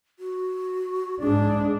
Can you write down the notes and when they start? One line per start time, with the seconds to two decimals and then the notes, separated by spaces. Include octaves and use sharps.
0.19 F#4
1.22 G#2 D4 G#4